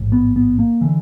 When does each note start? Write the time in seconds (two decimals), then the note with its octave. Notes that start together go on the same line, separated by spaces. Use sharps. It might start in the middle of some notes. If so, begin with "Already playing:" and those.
Already playing: A1 G#2
0.12 B3
0.36 B3
0.59 A#3
0.81 D3 E3